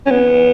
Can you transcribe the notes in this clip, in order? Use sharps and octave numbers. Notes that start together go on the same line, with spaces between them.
C#4
B3